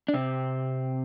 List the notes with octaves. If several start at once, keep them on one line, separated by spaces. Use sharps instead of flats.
D4
C3 C4